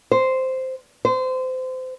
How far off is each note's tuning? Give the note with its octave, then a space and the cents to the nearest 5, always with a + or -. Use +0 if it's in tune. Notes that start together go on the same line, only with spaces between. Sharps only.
C5 -5
C5 -25